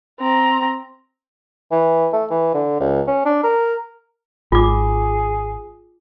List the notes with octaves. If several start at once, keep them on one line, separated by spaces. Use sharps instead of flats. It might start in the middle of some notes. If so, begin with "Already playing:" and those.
C4 A#5
E3
A3
E3
D3
C#2
C#4
D4
A#4
G#1 F4 G#4 D6